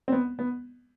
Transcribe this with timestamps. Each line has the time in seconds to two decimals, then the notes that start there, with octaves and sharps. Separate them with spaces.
0.08 C4
0.12 B3
0.39 B3